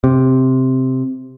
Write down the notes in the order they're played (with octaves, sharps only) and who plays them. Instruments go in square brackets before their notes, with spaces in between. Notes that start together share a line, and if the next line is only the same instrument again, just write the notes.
[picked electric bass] C3